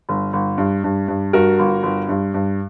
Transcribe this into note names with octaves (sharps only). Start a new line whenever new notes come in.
G1
G1
G2
G2
G2
G2 F#4 A#4
G1
G1
G2
G2